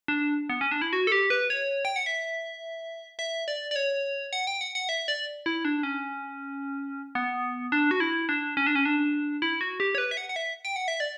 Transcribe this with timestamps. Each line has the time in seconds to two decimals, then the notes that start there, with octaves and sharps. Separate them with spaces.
0.08 D4
0.50 B3
0.61 C#4
0.71 D4
0.82 E4
0.93 F#4
1.07 A4
1.12 G4
1.30 B4
1.50 C#5
1.85 G5
1.96 F#5
2.06 E5
3.19 E5
3.48 D5
3.71 D5
3.76 C#5
4.33 F#5
4.47 G5
4.61 F#5
4.75 F#5
4.89 E5
5.08 D5
5.46 E4
5.65 D4
5.83 C#4
7.15 B3
7.72 D4
7.91 F#4
8.00 E4
8.29 D4
8.57 C#4
8.67 D4
8.75 C#4
8.85 D4
9.42 E4
9.61 F#4
9.80 G4
9.95 C#5
9.98 B4
10.11 E5
10.17 F#5
10.29 F#5
10.36 E5
10.65 G5
10.76 F#5
10.88 E5
11.00 D5